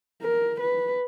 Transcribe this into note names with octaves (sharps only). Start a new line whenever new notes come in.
A#4
B4